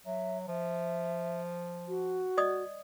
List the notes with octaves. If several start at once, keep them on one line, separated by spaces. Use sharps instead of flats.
F#3 E5
F3 E5
F#4
D5 D#5 D#6